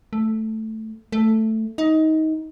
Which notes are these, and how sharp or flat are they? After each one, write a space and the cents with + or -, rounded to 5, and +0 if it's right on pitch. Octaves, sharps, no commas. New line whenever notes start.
A3 +0
A3 +5
D#4 +20